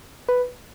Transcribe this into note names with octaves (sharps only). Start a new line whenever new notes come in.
B4